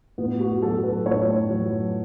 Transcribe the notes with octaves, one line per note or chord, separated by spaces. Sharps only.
A2 B3
F#4
F#4
F#3 A4
B4
A2 C#5
F#3